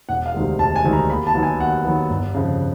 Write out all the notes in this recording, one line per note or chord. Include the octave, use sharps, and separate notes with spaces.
E1 F#5
F5
D2 C3 D#3 G#3
E1 A5
G#5
D2 C3 D#3 G#3
A#5
D#2 B5
A5
D#3 F#3 B3
G#5
D#2 F#5
D#3 F#3 B3
G1
F2 C#3